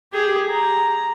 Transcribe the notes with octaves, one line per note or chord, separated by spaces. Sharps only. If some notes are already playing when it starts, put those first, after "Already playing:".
G4 G#4
A#5